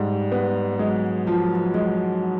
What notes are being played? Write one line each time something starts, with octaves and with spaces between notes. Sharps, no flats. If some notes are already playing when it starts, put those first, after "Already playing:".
Already playing: G#2 G3
B3
F#3 G#3
F3
G#3